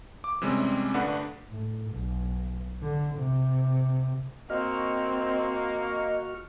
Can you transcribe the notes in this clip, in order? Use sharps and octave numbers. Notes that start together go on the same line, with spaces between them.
D6
C3 E3 G3 G#3 C4 C#4
G1 G2 A3 D4 B4 F#5
A2
B1
D3
C3
A#3 C4 F#4 D#5 C#6 F6